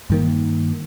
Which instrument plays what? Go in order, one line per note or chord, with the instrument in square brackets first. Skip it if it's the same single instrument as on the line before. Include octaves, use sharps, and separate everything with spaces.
[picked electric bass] G2 D#3 A#3